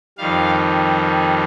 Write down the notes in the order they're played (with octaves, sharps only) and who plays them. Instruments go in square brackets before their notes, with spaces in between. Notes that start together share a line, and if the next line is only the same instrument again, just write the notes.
[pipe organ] F2 D#3 G3 F5